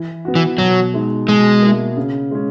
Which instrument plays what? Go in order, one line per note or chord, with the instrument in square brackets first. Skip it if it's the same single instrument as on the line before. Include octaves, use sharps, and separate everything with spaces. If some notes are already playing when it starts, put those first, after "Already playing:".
Already playing: [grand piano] E3
B3 F#4
[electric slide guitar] E3
[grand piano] B2 [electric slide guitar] F#3
[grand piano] G#3 D#4
[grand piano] B2 [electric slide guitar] G#3
[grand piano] A#3 E4
C#3
G#3 C#4